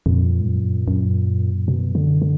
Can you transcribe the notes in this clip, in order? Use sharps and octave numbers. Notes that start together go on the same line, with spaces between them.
F2 A#2
G#2
F#2
F#2
B2
D3
D3